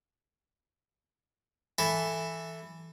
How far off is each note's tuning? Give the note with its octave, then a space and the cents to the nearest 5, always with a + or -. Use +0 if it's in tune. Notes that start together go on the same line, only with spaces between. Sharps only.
E3 +0 E4 +0 A4 +0